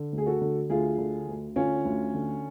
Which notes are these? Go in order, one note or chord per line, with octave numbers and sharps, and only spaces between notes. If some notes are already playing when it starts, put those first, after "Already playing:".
Already playing: D3
D2
G#4
F#4 A4
D3
D2 F4 G#4
D3
D2
D3 C#4 F4
D2
D3